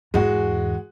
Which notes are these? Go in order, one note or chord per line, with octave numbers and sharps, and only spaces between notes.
E2 G#2 G#3 F#4